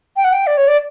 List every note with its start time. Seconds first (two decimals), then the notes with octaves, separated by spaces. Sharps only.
0.16 G5
0.24 F#5
0.33 G5
0.47 D5
0.57 C#5
0.68 D5